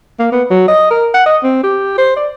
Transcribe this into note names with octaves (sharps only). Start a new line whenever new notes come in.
A#3
B3
F#3
D#5
A#4
F#5
D#5
C4
G4
C5
D5